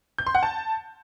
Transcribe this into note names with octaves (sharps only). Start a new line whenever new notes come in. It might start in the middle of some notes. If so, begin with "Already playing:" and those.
G6
C6
F#5
A5